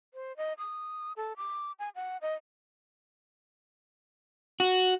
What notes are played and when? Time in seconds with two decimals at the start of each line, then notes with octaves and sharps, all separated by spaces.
0.14 C5
0.37 D#5
0.58 D#6
1.17 A4
1.37 D6
1.79 G#5
1.95 F#5
2.22 D#5
4.60 F#4